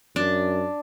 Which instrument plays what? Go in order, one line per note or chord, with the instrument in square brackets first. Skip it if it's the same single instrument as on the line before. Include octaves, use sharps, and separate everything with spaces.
[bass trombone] F#2 [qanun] D4